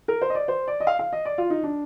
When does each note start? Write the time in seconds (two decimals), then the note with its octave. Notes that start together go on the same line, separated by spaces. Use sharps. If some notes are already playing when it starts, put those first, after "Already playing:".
0.08 A#4
0.21 C5
0.30 D#5
0.35 D5
0.48 C5
0.68 D5
0.80 D#5
0.87 F5
0.99 F5
1.13 D#5
1.25 D5
1.38 F4
1.50 D#4
1.63 D4